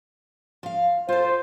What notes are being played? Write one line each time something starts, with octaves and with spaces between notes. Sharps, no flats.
F3 F5
F4 A4 C5